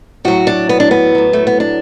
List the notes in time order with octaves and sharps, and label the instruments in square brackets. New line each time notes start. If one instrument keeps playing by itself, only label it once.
[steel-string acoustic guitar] A2 F#3 F#4
D4
B3
D4
B3
A2 F#3
A3
B3
D4